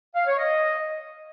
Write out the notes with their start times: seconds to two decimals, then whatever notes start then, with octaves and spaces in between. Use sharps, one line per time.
0.15 F5
0.26 C#5
0.37 D#5